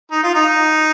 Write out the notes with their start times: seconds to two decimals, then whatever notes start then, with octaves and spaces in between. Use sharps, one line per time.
0.11 D#4
0.23 F4
0.35 D#4